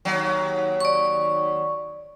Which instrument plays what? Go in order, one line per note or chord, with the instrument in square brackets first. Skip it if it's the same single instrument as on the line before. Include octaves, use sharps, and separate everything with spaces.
[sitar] D#2 F#3
[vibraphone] D5 C#6